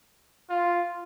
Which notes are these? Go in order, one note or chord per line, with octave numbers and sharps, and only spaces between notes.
F4